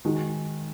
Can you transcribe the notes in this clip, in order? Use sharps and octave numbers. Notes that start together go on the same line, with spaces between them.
D#3 G#3 F#4